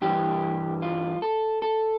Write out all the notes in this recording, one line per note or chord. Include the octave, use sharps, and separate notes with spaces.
G2 E3 G3 G4
F4
A4
A4